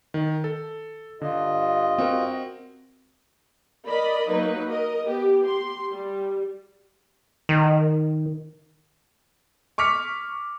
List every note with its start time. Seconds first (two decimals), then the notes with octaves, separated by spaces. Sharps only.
0.14 D#3
0.44 A4
1.21 G2 D3 F4 D#5
1.98 C4 F#4 A#4
3.88 A#4 D5 D#5 B5
4.30 F#3 A#3 D#4 B4
4.69 A#4 D#5
5.04 B3 G4
5.44 G4 C6
5.92 G3
7.49 D#3
9.78 C#6 D6 F6 B6 C#7